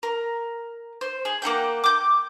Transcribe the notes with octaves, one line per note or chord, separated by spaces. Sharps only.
A#4
C5
G#4
A#3 E4 F#5 G5
D6 G6